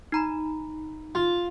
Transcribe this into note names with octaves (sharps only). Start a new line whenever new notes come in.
D#4 A#5 B5
F4